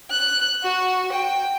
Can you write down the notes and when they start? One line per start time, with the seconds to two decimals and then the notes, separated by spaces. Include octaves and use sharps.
0.10 F#6
0.63 F#4
1.13 G5